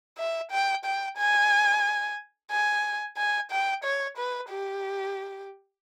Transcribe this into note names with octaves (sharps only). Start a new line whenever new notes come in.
E5
G5
G5
G#5
G#5
G#5
G5
C#5
B4
G4